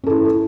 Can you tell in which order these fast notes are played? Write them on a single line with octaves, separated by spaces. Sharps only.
C#4 A4 E4